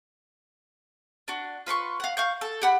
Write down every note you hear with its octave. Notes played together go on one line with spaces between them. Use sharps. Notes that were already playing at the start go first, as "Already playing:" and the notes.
D4 F#4
F4 B4 C6 C#6
F5 F#5
F5 C#6 G6
A4
G4 F#5 B5